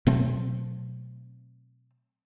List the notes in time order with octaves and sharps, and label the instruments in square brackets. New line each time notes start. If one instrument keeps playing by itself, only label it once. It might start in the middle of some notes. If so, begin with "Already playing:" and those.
[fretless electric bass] B2 F#3 A3 C4